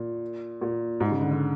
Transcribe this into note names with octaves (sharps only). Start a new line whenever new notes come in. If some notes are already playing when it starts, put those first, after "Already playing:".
Already playing: A#2
A#2
G#2
C#3
D3
D3